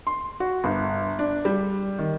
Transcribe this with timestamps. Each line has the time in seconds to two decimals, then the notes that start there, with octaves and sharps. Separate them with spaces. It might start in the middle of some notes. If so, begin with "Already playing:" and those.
0.07 C6
0.40 F#4
0.64 G1
1.19 D4
1.45 G3
1.99 D#3